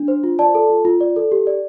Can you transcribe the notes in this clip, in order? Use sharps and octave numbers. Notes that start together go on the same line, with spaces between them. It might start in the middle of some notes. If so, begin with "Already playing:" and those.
Already playing: D4
C5
F4
D5 A5
A4
F4
F4
D5
A4
G4
D5